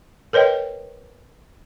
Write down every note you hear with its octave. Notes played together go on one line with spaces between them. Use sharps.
A#4 B4 C#5 D#5 G5